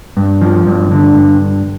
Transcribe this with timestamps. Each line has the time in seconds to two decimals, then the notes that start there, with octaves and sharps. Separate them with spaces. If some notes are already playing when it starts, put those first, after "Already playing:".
0.17 G2
0.41 F3
0.67 G2
0.92 D3
1.17 G2